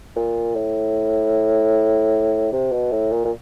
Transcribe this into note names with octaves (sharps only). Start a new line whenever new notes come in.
A#2
A2
C3
B2
A2
A#2
A#2